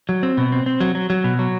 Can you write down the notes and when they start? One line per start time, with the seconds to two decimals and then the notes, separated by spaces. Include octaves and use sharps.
0.09 F#3
0.23 C4
0.37 B2
0.52 C4
0.66 C4
0.80 F#3
0.95 F#3
1.10 F#3
1.24 B2
1.39 F#3